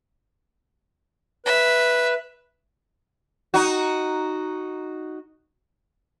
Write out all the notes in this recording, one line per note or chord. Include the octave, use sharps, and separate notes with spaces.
B4 E5
D#4 F#4